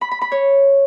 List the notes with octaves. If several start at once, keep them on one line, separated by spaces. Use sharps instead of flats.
B5
B5
B5
C#5